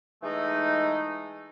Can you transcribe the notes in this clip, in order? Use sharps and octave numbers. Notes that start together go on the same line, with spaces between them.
E3 G#3 A3 D#4